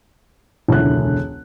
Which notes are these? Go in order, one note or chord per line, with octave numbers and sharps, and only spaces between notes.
E1 C#2 F#2 D3 E4 F#6